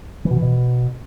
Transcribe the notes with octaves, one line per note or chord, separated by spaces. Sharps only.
E3
B2
E3
B2